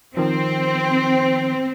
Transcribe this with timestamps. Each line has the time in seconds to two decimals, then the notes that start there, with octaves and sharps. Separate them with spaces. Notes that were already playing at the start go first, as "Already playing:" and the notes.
0.17 D#3 F3 C4